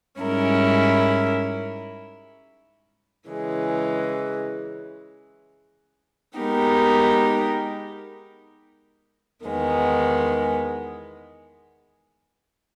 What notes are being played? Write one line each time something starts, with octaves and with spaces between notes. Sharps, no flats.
G#2 G3 C#4 E4 A#4
C#3 E3 G#3
G#3 B3 D#4 G4 A#4
E2 D#3 G#3 B3